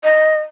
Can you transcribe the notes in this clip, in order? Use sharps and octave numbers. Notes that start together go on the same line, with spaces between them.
D#5